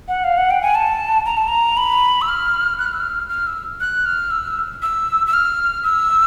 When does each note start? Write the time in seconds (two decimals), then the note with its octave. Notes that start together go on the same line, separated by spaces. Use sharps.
0.08 F#5
0.24 F5
0.38 F#5
0.51 G5
0.62 G#5
0.75 A5
1.26 A#5
1.37 A5
1.48 A#5
1.77 B5
2.22 E6
2.29 F6
2.79 F#6
2.86 F6
2.93 E6
3.00 F6
3.29 F6
3.47 E6
3.80 F#6
4.06 F6
4.31 E6
4.82 E6
5.27 E6
5.33 F6
5.84 E6